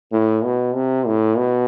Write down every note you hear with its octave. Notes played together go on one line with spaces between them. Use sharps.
A2
B2
C3
A2
B2